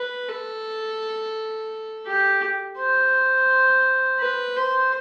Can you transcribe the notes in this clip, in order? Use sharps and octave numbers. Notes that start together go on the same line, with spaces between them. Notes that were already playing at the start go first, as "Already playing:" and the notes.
Already playing: B4
A4
G4
C5
B4
C5